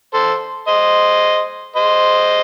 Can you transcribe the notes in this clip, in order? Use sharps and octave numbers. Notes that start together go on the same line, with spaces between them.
A4 C5
C5 D#5
C5 D#5